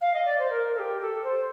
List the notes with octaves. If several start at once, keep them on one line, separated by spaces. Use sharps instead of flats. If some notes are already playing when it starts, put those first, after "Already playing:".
F5
D#5
D5
C5
A#4
A4
G4
A4
C5